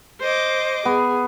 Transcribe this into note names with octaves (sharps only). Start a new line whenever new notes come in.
C5 D#5 D6
B3 G#4